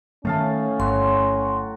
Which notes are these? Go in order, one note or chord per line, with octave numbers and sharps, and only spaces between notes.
A2 D#3 E3 A3 C#4 F5 A5
G1 F#3 F#4 C6